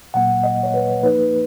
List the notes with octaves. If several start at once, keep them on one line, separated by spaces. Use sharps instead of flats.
A#2 F#3 A#3 F#5
D#5
C#5
B4
F3 A#3 D#4 B4